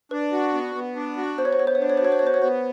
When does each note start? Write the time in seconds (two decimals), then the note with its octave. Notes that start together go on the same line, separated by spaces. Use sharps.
0.11 D4 B4
0.32 F#4
0.53 B3
0.75 B3
0.96 D4
1.17 F#4
1.37 B3 C5
1.45 C#5
1.53 C5
1.59 B3 C#5
1.67 C5
1.75 C#5
1.80 D4 C5
1.90 C#5
1.97 C5
2.01 F#4 C#5
2.12 C5
2.19 B3 C#5
2.27 C5
2.34 C#5
2.42 B3 C5